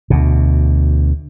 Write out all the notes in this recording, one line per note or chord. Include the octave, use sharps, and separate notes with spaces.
D2 B2